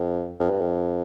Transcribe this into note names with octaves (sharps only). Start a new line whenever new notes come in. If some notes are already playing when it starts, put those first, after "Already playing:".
Already playing: F2
F2
G2
F2